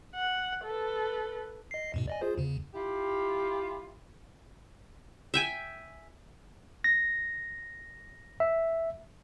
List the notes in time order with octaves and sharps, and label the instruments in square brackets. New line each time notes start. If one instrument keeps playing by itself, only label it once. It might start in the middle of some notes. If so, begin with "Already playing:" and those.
[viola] F#5
A4 B4
[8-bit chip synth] D#5 C7
E2 G#2 B2
D5 D#5 G#5
F4 G#4 C5
E2 C#3
[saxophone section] E4 F4 G4
[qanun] E5 G5 G#5
[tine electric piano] A#6
E5